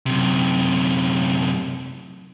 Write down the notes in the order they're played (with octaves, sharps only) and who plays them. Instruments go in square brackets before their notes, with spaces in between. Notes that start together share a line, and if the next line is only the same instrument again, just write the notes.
[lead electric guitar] F#2 C3